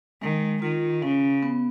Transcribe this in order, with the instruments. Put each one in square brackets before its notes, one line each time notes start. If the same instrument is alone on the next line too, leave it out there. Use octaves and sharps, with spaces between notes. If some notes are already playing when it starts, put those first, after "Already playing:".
[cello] D#3 [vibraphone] G#3
[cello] D#3 [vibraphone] F4
[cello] C#3 [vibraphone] C#4
[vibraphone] B3